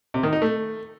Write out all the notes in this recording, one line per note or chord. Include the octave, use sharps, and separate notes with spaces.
C3
D#3
D#4
A3